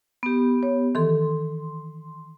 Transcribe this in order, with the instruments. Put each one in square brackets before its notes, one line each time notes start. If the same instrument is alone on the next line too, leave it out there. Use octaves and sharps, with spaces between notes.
[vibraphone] B3 G4
[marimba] C#5
[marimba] D#3 E3 A4 [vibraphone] C6